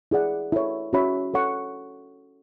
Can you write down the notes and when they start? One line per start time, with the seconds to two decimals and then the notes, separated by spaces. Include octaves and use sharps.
0.11 E4 G#4 D5 F#5
0.52 E4 A4 C#5
0.93 C#4 F#4 C#5 E5 B5
1.34 A4 C#5 F#5 C#6